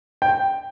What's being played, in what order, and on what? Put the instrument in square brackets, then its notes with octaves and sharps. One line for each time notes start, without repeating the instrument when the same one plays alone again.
[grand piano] G5